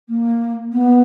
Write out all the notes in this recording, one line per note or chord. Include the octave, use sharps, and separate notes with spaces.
A#3
B3